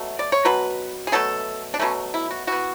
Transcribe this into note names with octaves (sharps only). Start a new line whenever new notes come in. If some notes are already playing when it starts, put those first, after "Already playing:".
Already playing: B2 F#3 A3
D5
C#5
B2 F#3 B4
G#4
B2 F#3 A3 A4
D4
B2 F#3 A3 C#4
E4
F#4
E3 B3 F#4